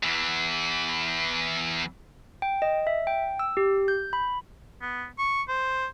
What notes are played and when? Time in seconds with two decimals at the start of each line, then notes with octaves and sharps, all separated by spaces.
0.03 E2 E3
2.42 G5
2.62 D#5
2.87 E5
3.07 G5
3.39 E6
3.57 G4
3.88 G6
4.13 B5
4.82 B3
5.18 C#6
5.48 C5